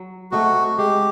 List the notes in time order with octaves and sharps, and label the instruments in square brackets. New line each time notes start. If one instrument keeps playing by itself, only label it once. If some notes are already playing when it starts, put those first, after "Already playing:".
Already playing: [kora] F#3
[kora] A3 C4 D#4 [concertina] F#4
[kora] G#3 [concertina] G4